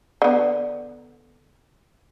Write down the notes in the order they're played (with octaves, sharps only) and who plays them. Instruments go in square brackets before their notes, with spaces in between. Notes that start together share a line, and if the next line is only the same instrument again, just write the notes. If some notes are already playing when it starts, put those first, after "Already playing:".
[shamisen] D3 B3